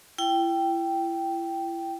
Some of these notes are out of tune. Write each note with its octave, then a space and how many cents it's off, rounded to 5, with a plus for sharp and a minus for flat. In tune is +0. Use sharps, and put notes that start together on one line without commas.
E4 +30 G5 -5